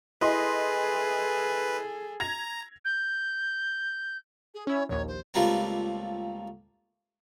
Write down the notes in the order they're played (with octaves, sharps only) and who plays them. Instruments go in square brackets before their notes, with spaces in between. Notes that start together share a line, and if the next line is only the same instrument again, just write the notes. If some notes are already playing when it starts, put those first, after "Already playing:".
[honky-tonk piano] E4 D#5 C6 [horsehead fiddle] G#4 A4 [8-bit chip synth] B4
[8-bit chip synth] A#5 [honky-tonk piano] G#6 A#6 F7
[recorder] G6
[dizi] G#4
[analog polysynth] C#4 E4 [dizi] C#5
[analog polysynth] A#1 D#2 [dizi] C#5
[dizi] C5
[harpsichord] C#2 F3 G3 A3 A#3 C4